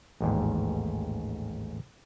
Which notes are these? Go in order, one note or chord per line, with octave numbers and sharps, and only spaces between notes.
A1 D#2 G#2